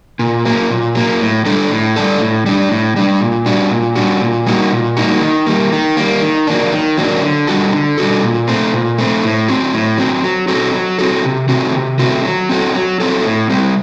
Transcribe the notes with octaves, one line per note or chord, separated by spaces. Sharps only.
A#2
F#3 A#3
A#2
F#3 A#3
A2
G3 D4 A4
A2
G3 D4 A4
A2
G3 D4
A2
G3 D4
A#2
G3 D4 F#4
A#2
G3 D4 F#4
A#2
G3 A#3 D#4 F#4
A#2
G3 A#3 D#4 F#4
D#3
G3 A#3
D#3
G3 A#3
D#3
F#3 A#3 D4
D#3
F#3 A#3 D4
D3
G3 D4 F#4 A4
D3
G3 D4 F#4 A4
A#2
A3 C4
A#2
A3 C4
A2
F#3 C4
A2
F#3 C4
F#3
C4 F#4 A4
F#3
C4 F#4 A4
C3
D#3 A3 C4 F#4
C3
D#3 A3 C4 F#4
F#3
C4 F#4 A4
F#3
C4 F#4 A4
A2
G3 C4